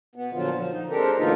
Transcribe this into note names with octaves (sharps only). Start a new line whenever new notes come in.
B2 B3
A#2 D3 F3 F#3 F4
F3
D#4
G#3 C4 D4 G4 A4 A#4
A2 D3 E3 A#3 D#4 F4